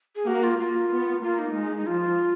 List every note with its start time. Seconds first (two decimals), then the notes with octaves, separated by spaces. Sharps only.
0.16 G#4
0.27 A#3 F#4
0.43 F4
0.59 A#3 F4
0.91 B3
1.22 A#3 F4
1.39 D#4
1.55 G#3
1.77 D#4
1.87 F3 F4